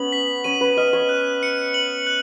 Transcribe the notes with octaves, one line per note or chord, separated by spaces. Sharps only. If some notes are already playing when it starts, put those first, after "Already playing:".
Already playing: B3 C#4 F#7
B6
C#4 D#7
B4
D#5 F6
C#5
F#6
C#7
F#7
F#6